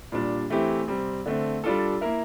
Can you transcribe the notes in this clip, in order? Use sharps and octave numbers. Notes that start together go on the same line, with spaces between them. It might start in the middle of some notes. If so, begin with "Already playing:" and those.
A#2 G3 D4
E3 A3 C4 E4 G4
C3 G3 C4
D3 A3 C4
G3 D4 F4 A4
A#3 E4 A#4 E5